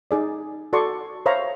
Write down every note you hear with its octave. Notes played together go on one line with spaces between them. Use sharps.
D#4 G#4 D5
F#4 A4 D5 C6 C#6
C5 C#5 E5 F5 A#5 B5